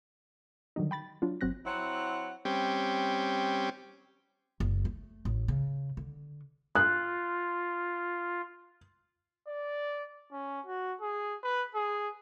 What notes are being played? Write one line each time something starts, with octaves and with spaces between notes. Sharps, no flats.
D3 D#3 F#3 G3 D#4
G5 B5 A6
F#3 D4 F4
G1 F#3 C4 F#6 A#6
F#3 C4 E4 F#5
G3 C4 C#4 G4
F#1
A3
A1
C#3
D3
F4 F#6
D5
C#4
F#4
G#4
B4
G#4